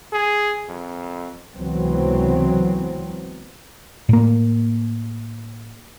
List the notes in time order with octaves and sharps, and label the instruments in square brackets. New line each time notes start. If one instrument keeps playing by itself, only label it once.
[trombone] G#4
F2
[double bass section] C#2 C3 E3 F#3 B3 C4
[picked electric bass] A2 A#3